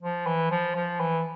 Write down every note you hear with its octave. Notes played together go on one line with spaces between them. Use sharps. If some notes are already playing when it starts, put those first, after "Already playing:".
F3
E3
F3
F3
E3